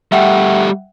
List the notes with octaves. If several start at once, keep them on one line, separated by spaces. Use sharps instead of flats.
G3 A3 E5 F#5 G5